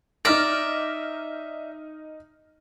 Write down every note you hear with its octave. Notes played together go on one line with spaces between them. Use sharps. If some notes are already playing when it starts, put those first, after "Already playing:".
D#4 D5 E5 F6 A#6